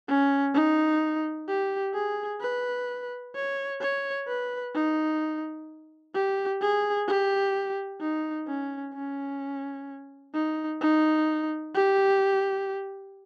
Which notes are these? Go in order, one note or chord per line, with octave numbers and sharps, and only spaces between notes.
C#4
D#4
G4
G#4
B4
C#5
C#5
B4
D#4
G4
G#4
G4
D#4
C#4
C#4
D#4
D#4
G4